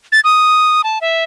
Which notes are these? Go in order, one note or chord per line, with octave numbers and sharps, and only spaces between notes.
A6
D#6
A5
E5